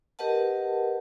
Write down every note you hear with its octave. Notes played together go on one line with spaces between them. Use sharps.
G4 A#4 B4 D#5 F#5 A5